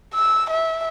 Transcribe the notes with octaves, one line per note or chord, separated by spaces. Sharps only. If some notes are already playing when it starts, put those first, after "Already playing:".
E6
E5